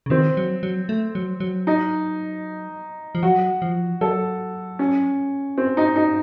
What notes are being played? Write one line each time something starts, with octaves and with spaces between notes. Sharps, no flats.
C#3
D#3 C4
F#3
F#3
A3
F#3
F#3
D#4
F3
F#3 F#4
F3
F#3 A4
C#4
C4
D#4
D#4